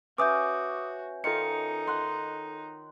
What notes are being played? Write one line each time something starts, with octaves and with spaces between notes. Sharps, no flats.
C#4 F#4 B4 E5 D6 D#6 G6
D#3 D#4 F4 A4 C#7
F#5 C6